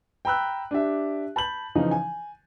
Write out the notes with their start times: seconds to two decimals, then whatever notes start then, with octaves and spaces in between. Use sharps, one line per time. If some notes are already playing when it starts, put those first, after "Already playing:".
0.25 G5 A#5 B5 E6 F#6
0.71 D4 G4 E5
1.36 A5 B5 G6 F#7
1.75 C#3 E3 F3 D#4
1.91 G#5